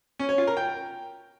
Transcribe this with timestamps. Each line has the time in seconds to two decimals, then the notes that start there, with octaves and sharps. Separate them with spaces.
0.19 C#4
0.29 C#5
0.38 F4
0.47 A#4
0.57 G5